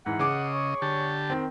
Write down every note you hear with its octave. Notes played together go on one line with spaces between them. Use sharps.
G#2 E3 F#5
C#3 G#4 D#5 D6
C#5
D3 G4 A5
D#3 C4